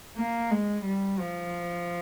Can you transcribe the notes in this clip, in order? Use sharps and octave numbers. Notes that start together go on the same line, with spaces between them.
A#3
G#3
G3
F3